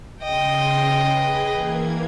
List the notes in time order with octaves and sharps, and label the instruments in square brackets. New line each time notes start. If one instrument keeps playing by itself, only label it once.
[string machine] C#3 C6 [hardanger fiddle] D#5 G5
[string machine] G#4 B4
E3 A#3 G#6